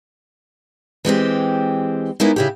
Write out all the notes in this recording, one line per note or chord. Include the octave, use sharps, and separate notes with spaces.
E3 G#3 C4 G4
G#3 A#3 B3 C#4 D#4 E4
C#3 E4 G4